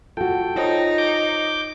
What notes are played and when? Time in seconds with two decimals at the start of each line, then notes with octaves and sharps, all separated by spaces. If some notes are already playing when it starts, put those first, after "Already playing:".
0.17 F4 F#4 A4 G5
0.56 D#4 F4 C5 C#5
0.98 D6 G6